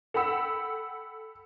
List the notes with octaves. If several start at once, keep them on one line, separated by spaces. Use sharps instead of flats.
A4 F#5 G5 B5 E6